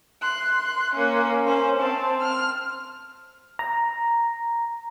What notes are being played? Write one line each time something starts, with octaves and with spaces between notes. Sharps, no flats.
C6 F#6
A#3 C#4
C#4 C5
C4 A5
F6
A#5